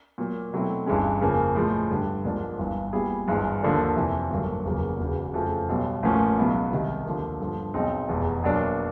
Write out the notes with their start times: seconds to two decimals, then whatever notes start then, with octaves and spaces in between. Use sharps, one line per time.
0.18 A#2 F#3 A#3
0.53 B2 F#3 A3 C4 E4
0.86 G1 G2 E3 G#3 C#4
1.21 F2 C#3 F3 A#3 C#4
1.55 A2 F3 G#3
1.91 G2 D3 G3
2.24 A#1 G#2 F3 A#3 D4
2.59 G1 G2 E3
2.93 A#2 G3 B3 E4 G#4
3.28 G#1 G2 E3 G#3
3.63 D#2 D3 F3 A#3 D4
3.96 F2 C3 E3
4.30 G#1 G2 D3 F#3 A#3
4.65 F1 E2 C#3 F#3 A#3
4.99 E1 E2 C#3
5.34 F2 C#3 F3 A3
5.69 B1 B2 G3
6.03 A1 A2 F3 A#3 C#4
6.37 C#2 B2 F#3 B3 E4
6.71 C2 C3 D#3
7.06 D#2 D3 F3 A#3
7.40 G2 D3 F3
7.74 B1 B2 G#3 C4 D#4
8.09 F1 E2 B2 G#3
8.43 B1 B2 F#3 A#3 D4